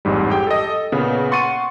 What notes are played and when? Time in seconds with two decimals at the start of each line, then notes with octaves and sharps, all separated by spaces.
0.05 A1 F2 G#2 G3
0.30 G4 G#4 G5
0.47 A4 D#5
0.92 A#2 C#3 B3
1.31 F#5 C6 C#6 A6 C#7 D#7